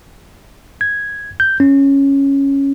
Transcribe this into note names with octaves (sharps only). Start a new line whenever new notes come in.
G#6
G6
C#4